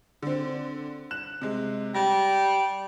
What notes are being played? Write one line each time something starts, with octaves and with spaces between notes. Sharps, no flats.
D3 C4
F#6 E7
C3 G#3
G3 A#6